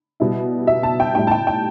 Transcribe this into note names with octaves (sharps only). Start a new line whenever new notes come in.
B2 G3 E4
E5
A5
G5
A2 G3 E4 G5
A5
G5
G5